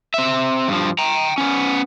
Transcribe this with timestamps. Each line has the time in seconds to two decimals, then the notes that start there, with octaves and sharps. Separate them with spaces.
0.14 C4 E5
0.68 G2 F3
0.99 G5 A#5
1.38 B3 C#4